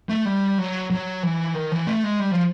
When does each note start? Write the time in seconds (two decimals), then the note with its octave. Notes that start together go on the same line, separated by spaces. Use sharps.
0.09 A3
0.25 G3
0.58 F#3
0.91 F#3
1.23 E3
1.55 D#3
1.72 E3
1.87 A3
2.04 G#3
2.20 G3
2.31 F3